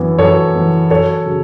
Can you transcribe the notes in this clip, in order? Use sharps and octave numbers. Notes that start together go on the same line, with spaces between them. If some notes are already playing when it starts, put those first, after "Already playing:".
Already playing: F#2 E3 B3
F#2 A4 C#5
E3 B3
F#2 A4 C#5
C#3 F#3